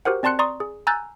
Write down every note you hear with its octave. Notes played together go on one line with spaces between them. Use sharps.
F#4 G4 A#4 C5 F#5
C4 D5 A5 C6 F#6 C#7
D5 A#5 C6 C#6 D#6
G#4
G#5 A#5 E6 F#6 G6 A6